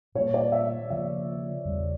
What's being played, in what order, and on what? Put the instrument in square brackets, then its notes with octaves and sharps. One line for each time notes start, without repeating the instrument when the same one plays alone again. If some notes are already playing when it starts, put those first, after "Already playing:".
[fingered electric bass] A#2 G3 A#3 [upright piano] C#5
[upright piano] D5
E5
[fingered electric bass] C#3 F3 A#3 [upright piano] E5
[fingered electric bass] E2 C#3 G3